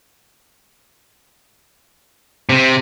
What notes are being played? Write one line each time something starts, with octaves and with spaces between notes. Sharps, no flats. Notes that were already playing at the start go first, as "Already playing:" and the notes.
C3